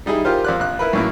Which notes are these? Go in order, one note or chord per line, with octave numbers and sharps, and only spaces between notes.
G3 D#4 E4 G#4
F4 G4 A#4 C5 F5
F2 D5 F#6
A#1 F#6
E4 A#4 B4
F#2 A2 A#3